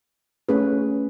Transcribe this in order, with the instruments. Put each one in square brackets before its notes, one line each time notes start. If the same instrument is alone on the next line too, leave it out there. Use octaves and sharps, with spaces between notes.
[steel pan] A3 C#4 G#4 B4